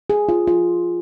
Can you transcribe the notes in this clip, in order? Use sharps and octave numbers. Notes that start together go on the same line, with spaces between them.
G#4
F4
F4